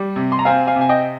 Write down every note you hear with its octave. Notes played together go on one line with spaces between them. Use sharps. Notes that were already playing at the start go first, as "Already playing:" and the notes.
Already playing: G3
C3
C6
A#5
C4 F5 G#5
F5 G#5
C3
G#5
D#5 G5